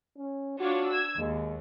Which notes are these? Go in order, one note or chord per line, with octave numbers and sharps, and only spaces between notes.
C#4
D4 F4 F#4 C#5
E6 G#6
D#2 G#3